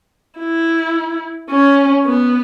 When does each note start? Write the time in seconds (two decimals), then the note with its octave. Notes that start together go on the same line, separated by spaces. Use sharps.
0.39 E4
1.50 C#4
2.05 B3